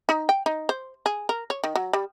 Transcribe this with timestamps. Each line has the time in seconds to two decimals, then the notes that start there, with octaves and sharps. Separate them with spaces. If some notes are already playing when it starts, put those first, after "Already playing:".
0.09 D#4
0.29 G5
0.46 D#4
0.69 C5
1.06 G#4
1.29 A#4
1.50 C#5
1.64 D#3
1.75 F#3
1.93 G3